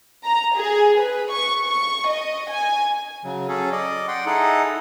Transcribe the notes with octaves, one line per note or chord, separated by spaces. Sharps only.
A#5
G#4
B4
C#6
C#6
D#5
G#5
C#3 F#3
F#3 C#4 G#4 A4
D5 D#5
F#5 G5 C6
D#4 E4 G#4 A4 D#5 F#5